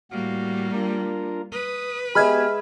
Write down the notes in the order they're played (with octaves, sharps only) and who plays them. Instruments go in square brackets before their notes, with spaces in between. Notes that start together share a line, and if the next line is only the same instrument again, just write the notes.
[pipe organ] A2 F#4 F5 [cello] G3 A#3
[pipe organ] D4 F4 A#4
[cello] B4 [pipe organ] D#6
[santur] G#3 E5 [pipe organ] B3 G4 [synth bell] B5 F6 G#6